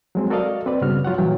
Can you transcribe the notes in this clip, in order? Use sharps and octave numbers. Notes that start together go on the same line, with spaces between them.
F#3 G#3 C4
F#4 A4 A#4 D5 D#5 F5
C4 B4 D5
G2 C#3 B3 F#4 F6
F#3 F4 C#5 F#5
A#2 E3 F#3 G5